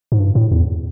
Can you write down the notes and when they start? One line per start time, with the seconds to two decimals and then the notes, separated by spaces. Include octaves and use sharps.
0.12 G#2
0.20 G2
0.35 A2
0.52 E2